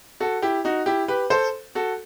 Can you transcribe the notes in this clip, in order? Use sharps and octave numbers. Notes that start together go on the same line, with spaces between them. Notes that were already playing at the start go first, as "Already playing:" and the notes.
F#4 A4
E4 G4
D#4 F#4
E4 G4
G4 B4
A4 C5
F#4 A4